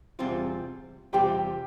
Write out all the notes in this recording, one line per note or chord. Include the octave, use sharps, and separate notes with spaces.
E2 C3 G3 C4 F4
E2 C3 G3 C4 F4 G4 G5